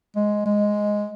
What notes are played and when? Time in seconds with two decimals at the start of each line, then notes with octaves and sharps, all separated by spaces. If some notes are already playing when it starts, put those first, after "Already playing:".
0.16 G#3
0.46 G#3